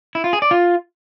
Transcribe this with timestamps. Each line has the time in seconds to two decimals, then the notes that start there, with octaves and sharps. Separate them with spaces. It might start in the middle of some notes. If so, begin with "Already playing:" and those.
0.15 E4
0.24 F4
0.33 G#4
0.42 D5
0.51 F4